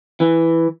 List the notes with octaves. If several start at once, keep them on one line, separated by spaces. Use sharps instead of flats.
E3